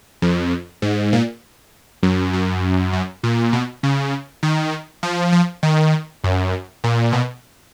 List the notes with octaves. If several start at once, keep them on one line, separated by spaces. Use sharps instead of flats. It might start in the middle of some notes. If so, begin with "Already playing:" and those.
F2
G#2
A#2
F#2
F#2
F#2
A#2
B2
C#3
D#3
F3
F3
D#3
F#2
A#2
B2